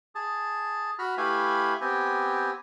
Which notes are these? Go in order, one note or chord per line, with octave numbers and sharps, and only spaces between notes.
G#4 A5
F#4 B5 F6
A3 E4 G4 B4 F5 G#5
B3 C4 G4 G#5